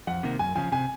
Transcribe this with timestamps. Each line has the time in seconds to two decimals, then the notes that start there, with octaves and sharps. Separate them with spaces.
0.07 F2 F#5
0.23 C3 D#3 A#3
0.39 F#2 G#5
0.55 C#3 F3 G#5
0.72 C3 G#5